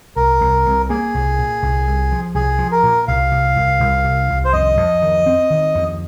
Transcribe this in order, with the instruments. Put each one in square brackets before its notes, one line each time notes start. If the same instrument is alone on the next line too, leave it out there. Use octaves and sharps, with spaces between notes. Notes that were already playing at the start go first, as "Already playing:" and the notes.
[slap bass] C2 [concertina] A#4
[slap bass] C2
C2
[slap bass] A#3 [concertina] G#4
[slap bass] C2
A#2
C2
C2
F3
[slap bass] C2 [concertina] G#4
[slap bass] F3
[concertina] A#4
[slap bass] A#2
[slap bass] C2 [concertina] F5
[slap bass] C3
C2
C2
C3
C2
[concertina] C5
[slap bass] F2 [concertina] D#5
[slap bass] F2
D#3
C4
D#3
F2